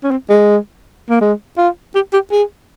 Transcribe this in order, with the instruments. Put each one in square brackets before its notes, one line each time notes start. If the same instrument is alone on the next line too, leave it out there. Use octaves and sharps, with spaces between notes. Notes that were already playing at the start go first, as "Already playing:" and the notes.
[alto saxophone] C#4
C4
G#3
A#3
G#3
F4
G4
G4
G#4